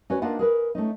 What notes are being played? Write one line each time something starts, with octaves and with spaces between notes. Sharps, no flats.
C#4 F#4 B4 C#5
A#3 D4 D#4 F4 F#5
G#4 A#4 B4
A3 C#4 D#4